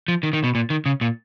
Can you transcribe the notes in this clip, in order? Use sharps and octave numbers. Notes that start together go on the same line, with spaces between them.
F3
D#3
D#3
B2
A#2
D#3
C#3
A#2